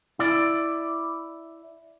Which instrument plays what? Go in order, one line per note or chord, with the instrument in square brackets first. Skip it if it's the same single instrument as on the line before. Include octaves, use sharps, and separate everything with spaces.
[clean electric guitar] E4 D5